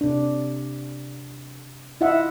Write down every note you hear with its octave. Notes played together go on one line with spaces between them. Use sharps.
C3 D4
E4 F4 D#5 E5 F#5